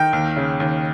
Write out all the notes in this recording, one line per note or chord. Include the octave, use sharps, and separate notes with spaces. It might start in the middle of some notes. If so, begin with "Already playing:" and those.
Already playing: D#3 G5
D#2
C#3
D#2